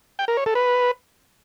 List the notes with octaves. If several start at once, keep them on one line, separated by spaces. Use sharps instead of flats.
G5
A#4
C#5
A4
B4